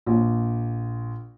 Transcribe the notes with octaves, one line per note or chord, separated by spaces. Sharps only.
A#1